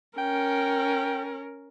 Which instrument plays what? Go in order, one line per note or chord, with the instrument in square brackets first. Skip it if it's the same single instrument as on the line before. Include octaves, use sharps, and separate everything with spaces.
[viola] C#4 A#4 [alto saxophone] G5